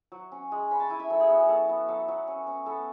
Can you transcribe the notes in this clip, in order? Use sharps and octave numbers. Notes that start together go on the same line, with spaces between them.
F#3
C#4
G#3
C#4 B5
A5
E4 G#5
E5
F#3 A4
G#4
B3 F#4
G#4
F#3 A4
B3
F#3 A4
F#3
C#4
C#4
B3 A4